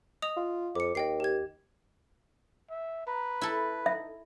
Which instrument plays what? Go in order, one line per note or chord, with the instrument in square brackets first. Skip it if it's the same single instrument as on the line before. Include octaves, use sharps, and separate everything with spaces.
[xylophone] D#5 D#6 F7
[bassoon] F4
[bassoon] F2 [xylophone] D6 C#7
[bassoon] D#2 [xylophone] D#5 G5 C7
[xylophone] G4 G#6
[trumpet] E5
[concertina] B4 [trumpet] A#5
[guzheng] E4 A4
[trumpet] D#4 [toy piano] E5